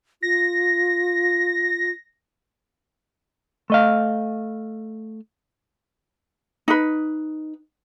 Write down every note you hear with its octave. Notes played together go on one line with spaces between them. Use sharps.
F4 A#6
A3 D#5 F5
D#4 B4